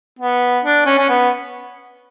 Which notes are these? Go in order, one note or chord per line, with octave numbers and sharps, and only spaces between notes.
B3
D4
C#4
C#4
B3